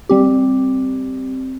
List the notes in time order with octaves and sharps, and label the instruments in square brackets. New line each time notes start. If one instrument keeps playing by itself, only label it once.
[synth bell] G3 C4 G4